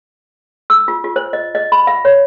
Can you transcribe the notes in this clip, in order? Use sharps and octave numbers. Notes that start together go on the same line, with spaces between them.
E6
F4
F4
C5
D#5
D#5
B5
F5
C#5